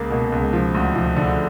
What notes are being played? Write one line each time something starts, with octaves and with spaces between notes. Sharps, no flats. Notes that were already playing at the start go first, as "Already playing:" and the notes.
Already playing: C#2 A#3
B2
C#2
F3
D2
F3
D3